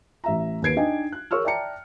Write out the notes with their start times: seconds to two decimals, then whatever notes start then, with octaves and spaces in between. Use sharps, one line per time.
0.24 A1 E5 A#5
0.62 D#2 A#3 B4 G#6 C7 D7
0.76 D4 D#4 D#5 G5 G#5
1.12 F#6
1.31 G#4 A#4 C#5 C#6 E6 F6
1.45 D5 E5 G5 A5 A#5 C#7